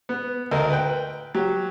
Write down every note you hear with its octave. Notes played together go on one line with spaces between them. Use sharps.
B3
D2 A#4 D#5
B4 G5
F#3 G4